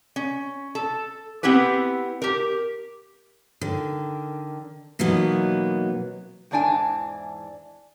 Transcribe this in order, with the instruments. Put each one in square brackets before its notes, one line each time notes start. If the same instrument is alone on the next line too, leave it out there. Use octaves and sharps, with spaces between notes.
[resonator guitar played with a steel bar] C#4
A4
B3 C4 E4 G4 B4
G4 A#4
[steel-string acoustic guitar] D3 D#3
B2 E3 F#3 A#3 B3 D#4
[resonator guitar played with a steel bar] E2 G#2 E3 D4 F4 G#5